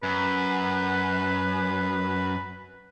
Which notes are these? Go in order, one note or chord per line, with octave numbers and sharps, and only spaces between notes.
F#2 B4